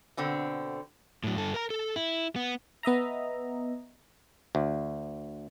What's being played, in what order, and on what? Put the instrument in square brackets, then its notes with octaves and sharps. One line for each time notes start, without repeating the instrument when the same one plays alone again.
[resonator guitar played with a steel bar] B2 D3 C4
[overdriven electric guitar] A2 F#3
G2 A4
A#4 A#5
A4
E4
B3
[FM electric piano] B3 D#5 E5 A#5
[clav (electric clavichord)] D2